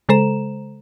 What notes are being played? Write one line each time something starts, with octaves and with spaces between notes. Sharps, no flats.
C#3 G#3 A4 C5 A#5 E7